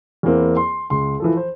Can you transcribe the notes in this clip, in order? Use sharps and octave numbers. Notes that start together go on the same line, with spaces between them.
E2 E3 A#3 C4
C6
C#2 C6
E3 F3 A4
C5